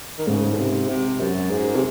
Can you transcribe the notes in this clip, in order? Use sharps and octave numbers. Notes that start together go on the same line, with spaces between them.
D#3
G#2 C#3 G#3
A2
C3
C3
F#2
G#2
C3